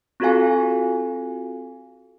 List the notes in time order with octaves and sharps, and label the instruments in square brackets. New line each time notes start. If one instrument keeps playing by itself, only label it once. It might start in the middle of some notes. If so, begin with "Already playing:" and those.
[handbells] C4 F4 F#4 A4 F5 G#5